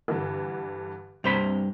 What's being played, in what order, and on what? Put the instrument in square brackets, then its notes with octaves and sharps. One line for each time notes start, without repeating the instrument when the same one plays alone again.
[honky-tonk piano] G2 D3 E3
[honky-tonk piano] C2 F7 [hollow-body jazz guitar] G2 C5 B5